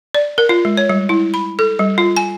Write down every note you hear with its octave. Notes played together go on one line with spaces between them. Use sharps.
D5
A#4
F4
G#3
C#5
G3
E4
B5
A4
G3
F4
G#5